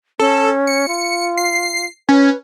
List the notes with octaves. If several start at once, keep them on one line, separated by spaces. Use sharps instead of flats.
C#4 A4
C#7
F4
C7
C#4 B4